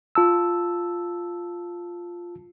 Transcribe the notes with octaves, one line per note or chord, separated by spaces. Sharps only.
F4 A5 E6